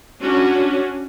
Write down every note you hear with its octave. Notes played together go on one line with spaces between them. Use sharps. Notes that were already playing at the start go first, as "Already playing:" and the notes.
C#4 D4 F#4